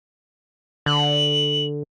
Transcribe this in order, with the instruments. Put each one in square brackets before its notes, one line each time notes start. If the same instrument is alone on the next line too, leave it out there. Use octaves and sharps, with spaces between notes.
[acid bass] D3 [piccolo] F#7